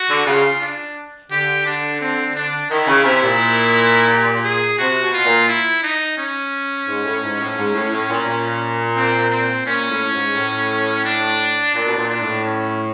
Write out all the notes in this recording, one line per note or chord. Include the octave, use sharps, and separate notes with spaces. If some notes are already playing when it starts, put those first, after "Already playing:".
Already playing: F#4
D3
C#3 F4
D4
D3 G4
D4
C4
D4
D#3 E4
C#3
C3
A#2
G4
G#4
C3 F#4
B2
F4
A#2
E4
D#4
C#4
G#2
A2
G#2
A2
G#2
A2
A2
A#2
A#2
C4
C4
A#2 C#4
A2
G#2
A2
D4
A#2 D4
B2
A#2
D4
A2
C#4